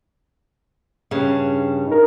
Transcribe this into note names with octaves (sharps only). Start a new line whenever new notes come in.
G2 C#3
D#4 A#4